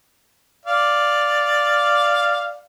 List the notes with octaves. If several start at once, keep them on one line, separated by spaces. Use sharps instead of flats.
D5 F5